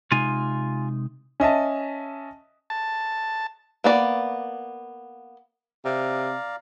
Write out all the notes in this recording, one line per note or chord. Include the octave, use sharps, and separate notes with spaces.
C3 G#3 D#4 F4 G#5
C#4 D#5 E5 A5
A5
A#3 B3 D5
C3 D5 F5 A#5